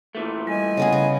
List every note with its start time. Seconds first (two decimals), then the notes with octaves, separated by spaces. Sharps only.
0.15 A#2 E3 A3
0.47 G3 D#5 G#5
0.77 C#3 B3 G#4
0.92 C#3